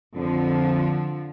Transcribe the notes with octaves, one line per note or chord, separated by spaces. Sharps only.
F2 D3 F3